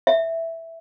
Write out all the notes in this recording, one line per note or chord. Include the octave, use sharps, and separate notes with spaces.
E5